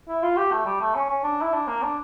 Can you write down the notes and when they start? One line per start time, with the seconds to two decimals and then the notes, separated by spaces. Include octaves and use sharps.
0.08 E4
0.23 F4
0.37 G4
0.52 A3
0.66 G3
0.81 A3
0.95 C#4
1.10 C#4
1.24 D4
1.42 E4
1.53 D4
1.68 A#3
1.82 D4